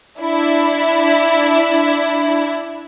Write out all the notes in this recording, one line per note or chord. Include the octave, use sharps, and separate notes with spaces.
D4 E4